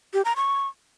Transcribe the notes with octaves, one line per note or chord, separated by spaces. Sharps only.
G4
A#5
C#6